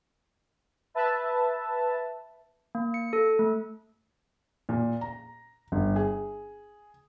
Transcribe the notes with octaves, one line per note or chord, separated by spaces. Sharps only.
B4 E5 A5
A#3
C#7
A4
A3
A#2
A#5
G1
G#4